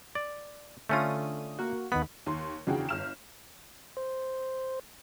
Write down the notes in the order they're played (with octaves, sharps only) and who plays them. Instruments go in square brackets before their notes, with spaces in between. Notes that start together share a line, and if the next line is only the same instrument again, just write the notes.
[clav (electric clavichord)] D5
[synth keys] D3 D#6 [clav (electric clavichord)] A3 C#4 F4
[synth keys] A#3 F#4
[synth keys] D#2 D#3 B5 [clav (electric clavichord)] B3
[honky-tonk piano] D#2 C6
E2 C#3 D4 F#4 G#4 G5
G1 F6 E7
[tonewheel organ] C5